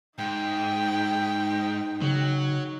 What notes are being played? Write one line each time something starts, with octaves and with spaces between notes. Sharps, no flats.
G#2 D#4 G5
C#3 F#3